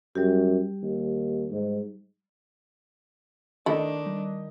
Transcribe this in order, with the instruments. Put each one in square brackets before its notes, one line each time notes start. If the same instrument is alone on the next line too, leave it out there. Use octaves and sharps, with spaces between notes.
[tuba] F#2 [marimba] G3 G4
[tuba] D#2
G#2
[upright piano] D#3 D#5 [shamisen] A3 E4 [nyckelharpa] D4
[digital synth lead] G3